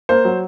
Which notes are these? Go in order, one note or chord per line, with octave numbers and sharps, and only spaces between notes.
A#3 C5
F#3